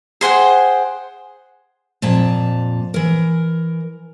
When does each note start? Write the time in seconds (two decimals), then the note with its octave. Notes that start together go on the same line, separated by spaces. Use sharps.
0.21 G#4 C5 F#5 G5
2.02 F2 A#2 A5 A#5
2.94 E3 A#4